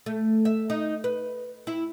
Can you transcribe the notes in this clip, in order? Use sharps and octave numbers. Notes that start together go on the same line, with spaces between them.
A3
E5
D#4
B4
E4